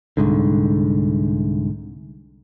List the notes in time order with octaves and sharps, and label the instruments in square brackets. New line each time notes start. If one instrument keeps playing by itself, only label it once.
[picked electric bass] C2 G#2 D3